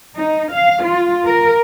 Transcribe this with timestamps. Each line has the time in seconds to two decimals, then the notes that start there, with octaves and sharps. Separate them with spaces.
0.16 D#4
0.53 F5
0.84 F4
1.26 A#4